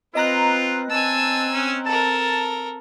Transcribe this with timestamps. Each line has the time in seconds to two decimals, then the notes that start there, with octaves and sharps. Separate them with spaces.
0.15 C4 F4 B4 D#5 A#5 F#6
0.91 C4 G#5 A5 E6
1.54 C#4
1.86 A4 A#4 A5